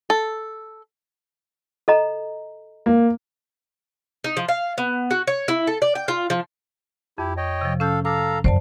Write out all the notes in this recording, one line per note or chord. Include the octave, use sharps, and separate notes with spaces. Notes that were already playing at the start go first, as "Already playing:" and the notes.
A4
A4 D#5 A#5
A#3
D#4
F3
F5
B3
F#4
C#5
E4
A4
D5
G5
F4
F3
F2 E4 G4
C#5 D#5 G5
C3 F3
C#4 A4 F5 G6
A4 F5 A#5 D6
F#2 C5 D5 A5